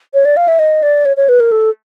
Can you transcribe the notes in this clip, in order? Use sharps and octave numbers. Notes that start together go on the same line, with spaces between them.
C#5
D5
F5
E5
D#5
D5
C#5
C#5
B4
A#4
A4